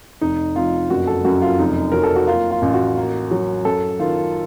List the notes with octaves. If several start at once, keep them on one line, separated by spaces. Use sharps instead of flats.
F1 D#4
F1 F4
F#1 F#4
A4
F#2 F#4
F4
F1 D#4
F#3 A#4
A4
F#4
A#3 F4
F4
A1
F#4
A#3
F#3
F#2 A4
D#3 F4